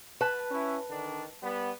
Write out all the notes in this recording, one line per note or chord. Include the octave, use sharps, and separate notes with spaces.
B4 A5
C#4 E4
D3 D#3 D4
G3 B3